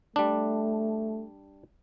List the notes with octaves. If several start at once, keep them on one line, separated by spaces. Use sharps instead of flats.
G3 A3 D4